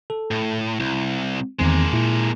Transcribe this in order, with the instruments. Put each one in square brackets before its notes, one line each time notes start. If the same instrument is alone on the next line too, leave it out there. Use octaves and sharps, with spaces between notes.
[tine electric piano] A4
[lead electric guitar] A2
[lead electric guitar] C2 [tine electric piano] E4
[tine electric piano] E2 D#3 C4 [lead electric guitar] G#3 A#3
[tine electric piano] A#2 E4